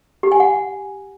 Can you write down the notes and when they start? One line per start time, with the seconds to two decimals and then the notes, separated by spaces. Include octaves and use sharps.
0.23 G4
0.32 G#5
0.40 F#5